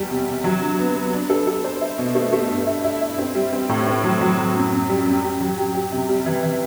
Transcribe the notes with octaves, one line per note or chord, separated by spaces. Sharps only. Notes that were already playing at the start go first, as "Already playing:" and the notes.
Already playing: E2 G3
C3
C3
F#3
D3
B3
B3
D4
A4
A4
C5
E4
B2
A3
A3
G2
E4
E4
E4
C4
G3
C4
A2
C4
F#3
F#3
F#3
F#2
F#2
G3
F#2
G4
F#3
G4
G4
C3
G3
E3
E3